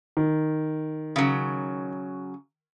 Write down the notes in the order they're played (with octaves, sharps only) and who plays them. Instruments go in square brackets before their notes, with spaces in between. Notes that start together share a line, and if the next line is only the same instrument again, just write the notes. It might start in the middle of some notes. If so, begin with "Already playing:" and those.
[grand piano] D#3
[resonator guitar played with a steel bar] C#3 F#3